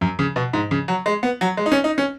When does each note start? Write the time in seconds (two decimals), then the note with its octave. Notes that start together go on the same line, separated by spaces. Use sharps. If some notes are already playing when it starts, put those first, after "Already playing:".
0.01 F#2
0.19 C#3
0.36 B2
0.53 G#2
0.71 C#3
0.88 F#3
1.06 G#3
1.23 B3
1.41 F#3
1.57 G#3
1.66 D#4
1.72 C#4
1.84 D#4
1.98 C#4